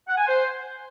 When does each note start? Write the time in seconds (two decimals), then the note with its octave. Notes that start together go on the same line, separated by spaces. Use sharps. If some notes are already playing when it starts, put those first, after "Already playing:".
0.08 F#5
0.17 G#5
0.27 C5